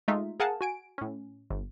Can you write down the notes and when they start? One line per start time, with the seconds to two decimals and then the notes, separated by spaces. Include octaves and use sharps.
0.08 G#3 A3 D#4 F4 E5
0.40 G#4 A#4 F5 F#5 G#5 A5
0.61 F#4 G#5 D7
0.98 A2 C#4
1.50 G1